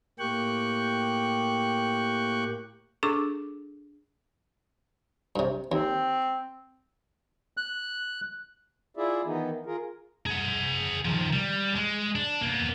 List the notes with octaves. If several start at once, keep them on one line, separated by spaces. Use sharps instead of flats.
A2 A#3 G4 G5 C#6 F#6
D4 G#4 A4 C#6 D6
G2 C3
D#2 C4
F#6
E4 F4 G#4 D5 E5
D#3 E3 B3 D#4
F4 G#4 A#4
G#4 F#5
D#3 F3
G3
G#3
D4
A#3 B3